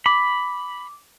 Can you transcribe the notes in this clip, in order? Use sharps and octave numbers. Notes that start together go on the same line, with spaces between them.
B5 D6